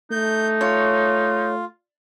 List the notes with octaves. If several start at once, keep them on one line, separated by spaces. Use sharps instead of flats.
A3 D#4 G6
F4 C#5